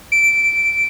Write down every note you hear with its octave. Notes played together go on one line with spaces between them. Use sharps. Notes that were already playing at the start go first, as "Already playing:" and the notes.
D7